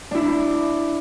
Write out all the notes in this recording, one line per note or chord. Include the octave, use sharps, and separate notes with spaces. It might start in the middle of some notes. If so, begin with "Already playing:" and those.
D4 E4